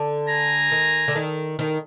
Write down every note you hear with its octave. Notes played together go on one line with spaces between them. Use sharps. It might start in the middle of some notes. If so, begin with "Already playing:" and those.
Already playing: D3
G#5 A#5
D#3
D3
D#3
D#3